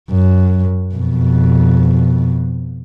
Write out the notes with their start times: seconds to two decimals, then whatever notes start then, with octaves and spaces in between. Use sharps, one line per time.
0.11 F#2
0.95 F2 B2